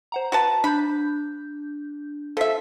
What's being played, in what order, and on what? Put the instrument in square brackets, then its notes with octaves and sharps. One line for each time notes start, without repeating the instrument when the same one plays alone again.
[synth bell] C5 F#5 A#5
[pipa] F#4 B4 A5
[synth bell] D4 G6 [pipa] B5
[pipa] F3 E5 [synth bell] A4 B6